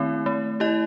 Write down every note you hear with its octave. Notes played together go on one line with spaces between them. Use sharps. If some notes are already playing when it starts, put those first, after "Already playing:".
Already playing: D#3 A3 C4 E4
A3
E4 G4 D#5